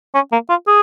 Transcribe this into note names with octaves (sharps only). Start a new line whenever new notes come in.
C#4
A#3
F4
G#4